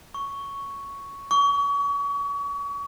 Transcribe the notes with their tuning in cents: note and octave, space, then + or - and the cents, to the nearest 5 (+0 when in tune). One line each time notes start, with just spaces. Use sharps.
C#6 +5
C#6 +35